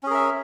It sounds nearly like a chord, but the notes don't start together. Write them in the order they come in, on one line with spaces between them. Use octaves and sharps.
C#4 G#4 A#4 E5